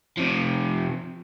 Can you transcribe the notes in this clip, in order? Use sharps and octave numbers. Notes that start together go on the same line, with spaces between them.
C3 F3